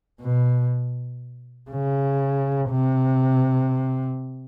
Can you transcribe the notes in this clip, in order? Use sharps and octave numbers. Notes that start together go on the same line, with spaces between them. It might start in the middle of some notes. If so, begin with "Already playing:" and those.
B2
C#3
C3